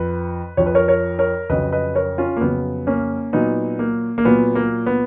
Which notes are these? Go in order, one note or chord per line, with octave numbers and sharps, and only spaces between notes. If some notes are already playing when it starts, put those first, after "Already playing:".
Already playing: F2 F3 B4
F2 F3 C#5
B4
A#4 C#5
A#4 C#5
A#4 C#5
F2 C#3 F#3 B4 D#5
B4 D#5
A#4 C#5
C#4 F4
A#3
F2 C#3 F#3 B3
A#3 C#4
A#2 F#3 B3 D#4
A#3
A#3
A#2 F#3 B3
A#3
B3